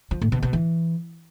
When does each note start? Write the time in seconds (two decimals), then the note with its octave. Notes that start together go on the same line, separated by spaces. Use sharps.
0.11 F3
0.21 A2
0.32 B2
0.42 B2
0.53 E3